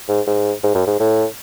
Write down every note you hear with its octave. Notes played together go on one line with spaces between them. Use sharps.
G#2
G#2
G#2
F#2
G#2
A2